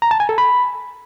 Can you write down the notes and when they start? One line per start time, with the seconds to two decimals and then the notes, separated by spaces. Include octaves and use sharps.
0.02 A#5
0.11 A5
0.20 G#5
0.29 A4
0.38 B5